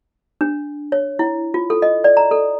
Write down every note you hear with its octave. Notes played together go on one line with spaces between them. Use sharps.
D4
C#5
E4
F4
A4
D#5
D5
A#5
A4